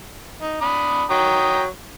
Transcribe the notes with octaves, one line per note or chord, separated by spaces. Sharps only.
D#4
D4 B5 D#6
F#3 G5 A#5 D#6